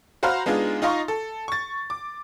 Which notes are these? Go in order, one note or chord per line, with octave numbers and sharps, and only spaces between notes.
F#4 C5 F5 A#5 B5 F6
G#3 B3 D4 D#4 F4 G#4
D#4 F4 D#5 F5 C6 C#6
A4
C#6 A6
D6